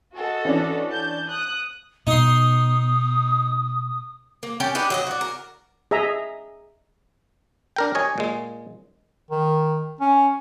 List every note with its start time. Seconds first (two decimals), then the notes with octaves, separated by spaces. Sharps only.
0.14 F#4 A4 D#5
0.45 E3 C#4 D4
0.91 A5 G6
1.29 D#6 F#6
2.07 B2 D#4 C6 D#6
4.43 A#3
4.60 C#4 G4 G5 A5
4.75 D4 D#4 G4 B4
4.90 F#3 D5 D#5
5.07 F#4 D5
5.21 A#4
5.91 G#4 D#5 E5 A#5
7.76 D4 A#4 G5
7.95 G4 C#5 D#5 G#5
8.18 A#2 G#3
9.30 D#3
10.00 C#4